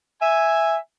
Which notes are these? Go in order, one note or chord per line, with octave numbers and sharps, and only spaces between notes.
E5 G#5